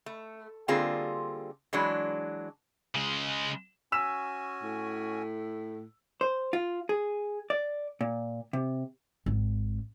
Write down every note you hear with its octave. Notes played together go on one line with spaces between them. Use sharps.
A3
D3 G3 A#3 C4 F4 G#4
E3 F#3 G#3 D4
C#3 G#3
C#4 F#4 G#5 E6 B6 E7
A2
C5
F4
G#4
D5
A#2
C3
G#1